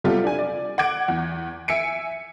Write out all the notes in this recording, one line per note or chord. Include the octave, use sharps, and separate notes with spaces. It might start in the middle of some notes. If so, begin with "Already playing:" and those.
C3 G3 B3 F4 A4
D4 G#5
D5
F#5 D6 G#6 D7
E2
E5 G#5 C#7 D7